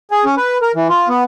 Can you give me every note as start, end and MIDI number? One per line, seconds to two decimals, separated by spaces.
0.11 0.24 68
0.25 0.35 61
0.37 0.58 71
0.62 0.72 70
0.75 0.88 52
0.89 1.08 65
1.09 1.24 59